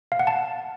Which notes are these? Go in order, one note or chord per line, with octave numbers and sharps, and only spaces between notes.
F5
F#5
A5